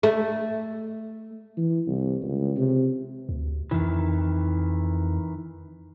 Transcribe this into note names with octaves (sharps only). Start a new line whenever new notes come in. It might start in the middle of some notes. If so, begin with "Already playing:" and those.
A3
E3
C2
C#2
C3
D2
F2 D#3 E3